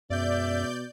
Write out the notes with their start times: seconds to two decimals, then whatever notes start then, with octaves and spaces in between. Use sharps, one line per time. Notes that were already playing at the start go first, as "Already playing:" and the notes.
0.10 F#2 B2 G#3 C#4 D5 E5 G6